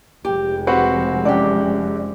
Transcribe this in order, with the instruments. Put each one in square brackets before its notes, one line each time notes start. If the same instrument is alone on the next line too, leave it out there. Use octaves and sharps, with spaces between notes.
[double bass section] F1 F3 G#3 [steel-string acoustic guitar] G4
[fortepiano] C4 F#4 B4 [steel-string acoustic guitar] G4 F#5
[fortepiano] A1 F#2 F#5 [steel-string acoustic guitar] G4 D5